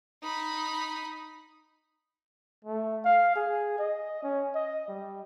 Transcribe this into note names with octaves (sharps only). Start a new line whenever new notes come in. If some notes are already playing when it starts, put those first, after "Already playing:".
D#4 B5
A3
F5
G#4
D#5
C#4
D#5
G3